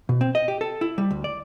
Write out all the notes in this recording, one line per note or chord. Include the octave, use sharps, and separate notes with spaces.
B2
C4
D#5
G4
A4
E4
G3
D2
D5